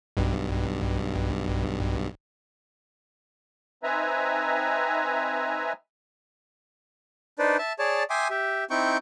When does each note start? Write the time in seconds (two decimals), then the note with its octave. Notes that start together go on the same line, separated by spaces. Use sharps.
0.17 B1 G2
3.83 C4 D#4 B4 E5 G#5 A#5
7.39 D4 D#4 B4 C5 D5
7.59 E5 A5
7.79 G#4 C#5 D5 A5
8.10 E5 G5 G#5 C6 D6 D#6
8.30 G4 E5
8.70 C4 D#4 E4 G5 C#6 G6